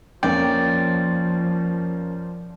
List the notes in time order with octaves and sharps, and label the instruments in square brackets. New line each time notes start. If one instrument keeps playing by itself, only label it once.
[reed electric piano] F2 G5 [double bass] F3 [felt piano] A#3 C#4 [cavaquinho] D5